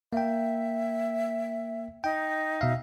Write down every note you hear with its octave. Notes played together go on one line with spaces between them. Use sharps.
A#3 E5 G5
D#4 G5
B2 E5 F5